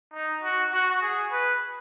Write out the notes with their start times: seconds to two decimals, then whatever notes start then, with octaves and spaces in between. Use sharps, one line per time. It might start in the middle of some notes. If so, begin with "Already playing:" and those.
0.14 D#4
0.43 F#4
0.73 F#4
1.02 G#4
1.32 B4